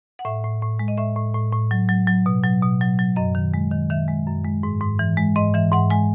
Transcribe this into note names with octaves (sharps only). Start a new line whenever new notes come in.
F#5
A2 E5
A2
A2
G#3
D#5
A2 E5
A2
A2
A2
F#3
F#3
F#3
B2
F#3
B2
F#3
F#3
F#2 D#5
D#3
G#3
D#3
D#3 E5
G#3
F#2
G#3
G#2
G#2
E3
G#3
G#2 D#5
E3 E5
G#2 F#5
G#3 G#5